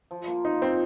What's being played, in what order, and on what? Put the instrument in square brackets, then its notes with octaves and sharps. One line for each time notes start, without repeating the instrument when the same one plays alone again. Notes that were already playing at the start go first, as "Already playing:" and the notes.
[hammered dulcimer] F3
A#3 F4
[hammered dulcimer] F3 [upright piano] D#4
[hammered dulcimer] A#3 F4 [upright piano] C4